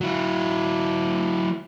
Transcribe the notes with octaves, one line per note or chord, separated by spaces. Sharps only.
F#3 E4